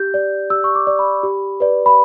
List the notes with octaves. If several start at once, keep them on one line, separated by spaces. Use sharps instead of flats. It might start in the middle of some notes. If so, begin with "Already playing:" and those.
Already playing: G4 G6
D5
G4 E6
C#6
D6
D5
B5
G4
B4 D5
B5